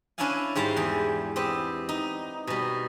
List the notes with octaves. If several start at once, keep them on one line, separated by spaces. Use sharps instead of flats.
C#4 D4 E4 D5 F5 G#5
G#2 G3 C5 A5 A#5
E2 E4
B3 C4 G4
D#4
B2 G3